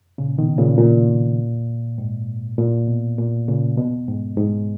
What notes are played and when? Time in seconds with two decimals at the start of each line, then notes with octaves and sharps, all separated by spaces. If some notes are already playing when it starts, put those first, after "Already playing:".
0.18 A#2 C#3
0.38 B2 D#3
0.58 A#2 C#3
0.78 A#2
1.98 G#2
2.58 A#2
2.88 B2
3.18 A#2
3.48 A#2 C#3
3.78 B2
4.08 G#2
4.37 G#2